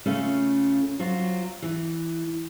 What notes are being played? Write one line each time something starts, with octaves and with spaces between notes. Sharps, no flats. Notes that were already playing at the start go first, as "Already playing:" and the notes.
C#3 A3 C#4 F4
F#3 F4 C5
E3